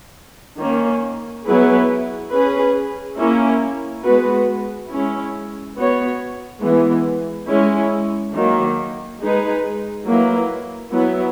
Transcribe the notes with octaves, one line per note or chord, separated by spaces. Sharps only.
D#3 A#3 C#4
F#3 B3 E4 G#4 B4
C#4 G#4 B4
A#3 C#4 E4
G#3 B3 F#4 B4
G#3 C#4 E4
B3 F#4 C#5
E3 G#3 B3
G#3 C#4 E4
D#3 F#3 A#3
G#3 D#4 G#4 B4
F#3 A#3 E4 B4
F#3 B3 E4